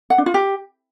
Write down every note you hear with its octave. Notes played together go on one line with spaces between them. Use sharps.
F#5
D4
F4
G4